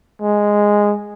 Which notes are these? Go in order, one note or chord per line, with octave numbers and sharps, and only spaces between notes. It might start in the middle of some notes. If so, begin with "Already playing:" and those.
G#3